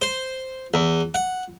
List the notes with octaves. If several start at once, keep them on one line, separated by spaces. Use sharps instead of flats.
C5
E2
F#5